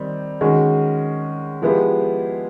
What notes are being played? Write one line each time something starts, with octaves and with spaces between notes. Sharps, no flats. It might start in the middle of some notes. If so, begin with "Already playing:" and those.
Already playing: D#3 G3 C4
D#3 G#3 C#4 F#4
F3 G#3 B3 E4 G4